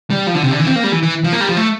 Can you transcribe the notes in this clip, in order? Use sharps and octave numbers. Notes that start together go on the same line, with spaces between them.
G3
F3
D3
C3
D3
E3
C4
A#3
G3
E3
E3
F3
A#3
G3
F3
A3